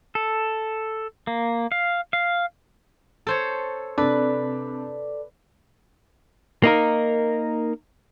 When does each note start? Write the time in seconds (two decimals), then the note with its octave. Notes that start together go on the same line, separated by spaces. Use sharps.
0.15 A4
1.27 A#3
1.72 F5
2.13 F5
3.27 A4 C5 C#5
3.98 C3 D4 A4 B4 D5
6.64 A#3 D#4 A#4